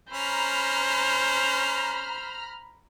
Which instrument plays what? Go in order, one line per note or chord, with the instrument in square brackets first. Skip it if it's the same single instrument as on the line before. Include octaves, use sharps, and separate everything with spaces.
[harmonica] C#4 [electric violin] C5 [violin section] A#5 B5 F6